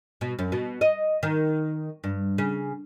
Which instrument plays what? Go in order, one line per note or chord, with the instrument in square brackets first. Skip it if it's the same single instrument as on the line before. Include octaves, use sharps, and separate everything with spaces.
[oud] B2
F#2
B2
D#5
D#3
G2
C#3